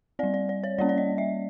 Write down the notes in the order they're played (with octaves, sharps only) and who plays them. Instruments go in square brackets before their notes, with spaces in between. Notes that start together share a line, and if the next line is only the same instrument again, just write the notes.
[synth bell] G3 C4 D5
D5
D5
C#5
G3 A#3 C#4 D5
D5
D#5
E5